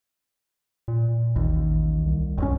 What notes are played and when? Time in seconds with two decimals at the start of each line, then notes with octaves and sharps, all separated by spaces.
0.88 A#2
1.36 A1 D#2
2.05 C2
2.38 F#1 C#2 C#4